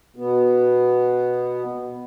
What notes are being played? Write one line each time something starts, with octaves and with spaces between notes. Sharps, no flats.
B2 B3